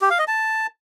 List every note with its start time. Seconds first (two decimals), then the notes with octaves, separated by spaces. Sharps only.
0.01 G4
0.10 F5
0.19 D#5
0.28 A5